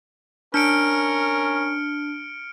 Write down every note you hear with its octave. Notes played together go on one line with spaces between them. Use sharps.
C#4 D4 A#4 F6 C#7 D7